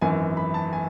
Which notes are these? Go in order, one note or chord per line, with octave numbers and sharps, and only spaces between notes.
G#1 F#2 E3 G#5
B5
A5
G#5